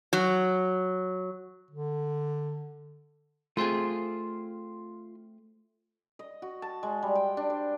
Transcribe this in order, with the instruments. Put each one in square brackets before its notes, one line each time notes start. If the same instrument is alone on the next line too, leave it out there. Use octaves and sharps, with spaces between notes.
[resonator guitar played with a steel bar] F#3
[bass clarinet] D3
[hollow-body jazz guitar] A3 C4 G#4 [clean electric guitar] F4 C6
[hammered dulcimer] D#5
F#4
A5
G#3
G3
G5
D4
C5